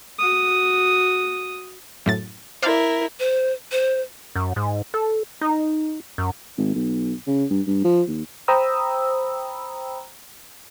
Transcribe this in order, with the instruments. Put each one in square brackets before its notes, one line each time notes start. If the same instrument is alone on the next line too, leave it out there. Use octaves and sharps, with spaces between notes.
[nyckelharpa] F#4 D#6
[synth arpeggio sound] F#2 A2 A6
[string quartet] E4 A#4 [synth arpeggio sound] C5 D5 F5
[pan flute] C5
C5
[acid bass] F#2
G#2
A4
D#4
F#2
[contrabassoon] G#1
B1
C#3
G2
G2
F3
D#2
[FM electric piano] C5 G5 A#5 B5 D#6 E6